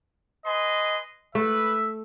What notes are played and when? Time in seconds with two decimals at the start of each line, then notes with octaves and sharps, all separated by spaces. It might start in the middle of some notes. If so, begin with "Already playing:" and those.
0.46 B4 D#5 G#5 C6
1.35 A3 B4 E5